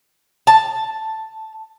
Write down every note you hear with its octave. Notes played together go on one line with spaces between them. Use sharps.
A5